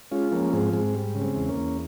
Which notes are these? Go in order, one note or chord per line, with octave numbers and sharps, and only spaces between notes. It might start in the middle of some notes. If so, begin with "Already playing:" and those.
G#3 C#4 F4
F3 A#3 C#4
G#2 G#3 C4
G#2 G#3 C4
G3
C#3
G#3 C4
E2
A#3 C#4
E2